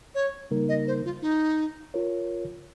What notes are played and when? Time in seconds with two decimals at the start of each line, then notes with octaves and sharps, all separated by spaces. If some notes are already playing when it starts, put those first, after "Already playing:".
0.15 C#5
0.51 C#3 G3 A#3 D#4 A#4
0.69 D#5
0.87 C5
1.05 F4
1.22 D#4
1.94 F4 A#4 C#5